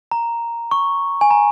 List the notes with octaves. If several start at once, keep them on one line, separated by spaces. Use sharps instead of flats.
A#5
C#6
G#5
A#5